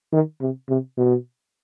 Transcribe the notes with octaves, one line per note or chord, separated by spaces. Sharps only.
D#3
C3
C3
B2